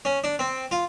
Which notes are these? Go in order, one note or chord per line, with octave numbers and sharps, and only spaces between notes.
C#4
D4
C4
F4